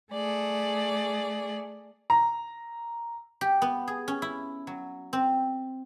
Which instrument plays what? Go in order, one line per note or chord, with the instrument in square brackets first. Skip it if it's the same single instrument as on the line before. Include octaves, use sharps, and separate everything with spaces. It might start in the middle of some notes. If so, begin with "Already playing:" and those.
[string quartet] A3 G#4 D5
[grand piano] A#5
[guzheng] G4
B3
G#4
C#4
E4
F#3
C4